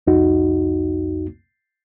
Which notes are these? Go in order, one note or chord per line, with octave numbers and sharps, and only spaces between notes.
C2 F2 D#4 F#4